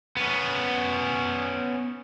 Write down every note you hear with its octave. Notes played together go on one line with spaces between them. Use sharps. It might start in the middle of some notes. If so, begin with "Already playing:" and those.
B3 C#4